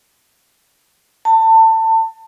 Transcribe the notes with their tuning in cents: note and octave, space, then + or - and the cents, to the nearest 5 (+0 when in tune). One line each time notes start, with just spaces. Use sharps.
A5 +25